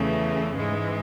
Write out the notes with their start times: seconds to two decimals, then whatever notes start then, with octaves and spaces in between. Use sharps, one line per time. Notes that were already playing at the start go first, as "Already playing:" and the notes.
Already playing: E2 C#3 E3 A3
0.55 G#2 E3 G#3